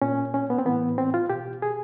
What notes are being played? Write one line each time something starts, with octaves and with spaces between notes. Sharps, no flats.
A#2 C#4
C#4
B3
C4
A2 E3 B3
C4
F4
B2 G4
G#4